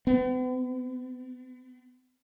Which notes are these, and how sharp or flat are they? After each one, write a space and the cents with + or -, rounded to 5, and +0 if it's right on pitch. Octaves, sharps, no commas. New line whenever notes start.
B3 +45